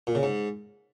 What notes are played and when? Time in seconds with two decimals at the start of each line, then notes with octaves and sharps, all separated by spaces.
0.07 A#2
0.15 C#3
0.23 G#2